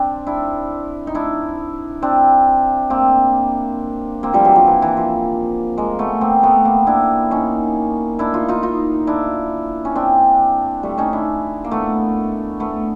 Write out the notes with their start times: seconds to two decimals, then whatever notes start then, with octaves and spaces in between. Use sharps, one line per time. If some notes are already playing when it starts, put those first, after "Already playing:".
Already playing: C4 D4
0.27 D4 E4
1.07 D#4
1.15 D4 E4
2.02 C4 D4
2.90 A#3 C4
4.23 A#3 C4
4.33 F3 G3
4.45 E3 F#3
4.56 F3
4.67 E3
4.82 E3
4.97 F3
5.78 G#3 A#3
5.99 A3 B3
6.21 A#3 C4
6.43 A3 B3
6.65 A#3 C4
6.87 D4 E4
7.31 C#4 D#4
8.19 D4 E4
8.34 D#4 F4
8.48 D#4 F4
8.63 D#4 F4
9.07 D4 E4
9.85 C#4
9.95 C4 D4
10.83 G3 A3
10.98 C#4 D#4
11.13 D4 E4
11.64 A#3
11.71 A3 B3
12.60 A3 B3